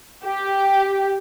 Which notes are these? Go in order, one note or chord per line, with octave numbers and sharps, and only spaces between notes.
G4